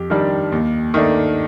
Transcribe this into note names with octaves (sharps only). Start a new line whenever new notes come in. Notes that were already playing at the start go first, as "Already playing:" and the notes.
Already playing: F2 G4
D#3 G3 D4
D#2
D#3 A3 D4